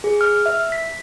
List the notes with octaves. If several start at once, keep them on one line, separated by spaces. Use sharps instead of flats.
G#4
F6
E5
B6